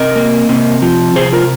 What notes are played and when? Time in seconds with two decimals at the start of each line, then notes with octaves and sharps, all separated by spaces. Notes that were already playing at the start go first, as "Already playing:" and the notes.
Already playing: C3 A#4 D#5
0.16 A#3
0.49 C3
0.82 F3
1.16 C3 G#4 C5
1.32 F4 A#4